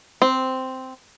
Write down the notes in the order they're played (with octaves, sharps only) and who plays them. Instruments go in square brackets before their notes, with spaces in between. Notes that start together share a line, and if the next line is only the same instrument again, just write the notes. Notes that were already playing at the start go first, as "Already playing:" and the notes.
[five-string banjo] C4